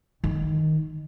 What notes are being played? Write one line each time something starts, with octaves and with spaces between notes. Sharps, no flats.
D#3